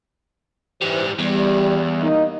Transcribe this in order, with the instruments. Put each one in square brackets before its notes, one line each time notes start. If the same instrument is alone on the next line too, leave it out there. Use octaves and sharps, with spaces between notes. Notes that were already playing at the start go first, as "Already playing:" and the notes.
[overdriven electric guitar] G#2 G3 [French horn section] E3 C5
[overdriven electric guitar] E2 [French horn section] G3
[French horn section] A#3 D#4 D#5